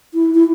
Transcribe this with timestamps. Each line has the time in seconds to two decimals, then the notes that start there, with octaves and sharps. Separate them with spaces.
0.14 E4
0.35 E4